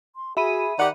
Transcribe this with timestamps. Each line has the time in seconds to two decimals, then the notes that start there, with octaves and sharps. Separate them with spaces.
0.16 C6
0.37 F#4 G#4 E5 B5 D#7
0.79 D#3 G4 D5 F#5